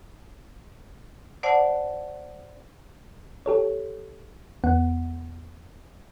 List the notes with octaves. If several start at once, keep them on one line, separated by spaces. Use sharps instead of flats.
C5 D5 F#5 A5
G4 A4 C#5
E2 B3 F#5